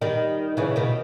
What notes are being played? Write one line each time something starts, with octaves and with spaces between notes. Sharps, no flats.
D#3 G3
C#3 E3
B2 D#3